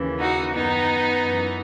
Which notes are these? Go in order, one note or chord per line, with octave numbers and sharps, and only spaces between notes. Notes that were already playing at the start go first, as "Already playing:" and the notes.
Already playing: D#2 C#3 E3
D#4 F#4
F#2 D#3 B3 D#4
F#2 E3